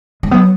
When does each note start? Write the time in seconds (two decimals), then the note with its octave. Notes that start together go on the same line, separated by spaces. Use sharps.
0.23 G#3
0.31 F#3 B3